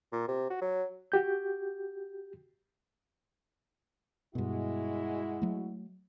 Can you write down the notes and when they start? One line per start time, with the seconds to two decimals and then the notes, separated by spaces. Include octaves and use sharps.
0.12 A#2
0.28 C3
0.50 F#4
0.61 F#3
1.12 F#4 G4 G6
4.35 G2 B2 G#3 E4 F#4
5.42 F#3 A3